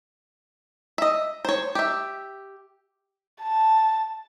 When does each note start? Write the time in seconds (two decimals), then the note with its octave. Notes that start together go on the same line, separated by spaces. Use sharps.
0.98 D#5 E5
1.45 C5 C#5
1.75 G4 E5
3.42 A5